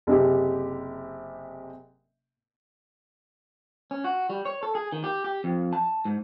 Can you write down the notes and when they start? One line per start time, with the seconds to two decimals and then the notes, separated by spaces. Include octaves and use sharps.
0.07 F#1 C3 G4
3.91 C#4
4.04 F#4
4.30 G3
4.45 C#5
4.63 A4
4.75 G#4
4.92 D#3
5.04 G4
5.24 G4
5.44 F2
5.73 A5
6.05 G#2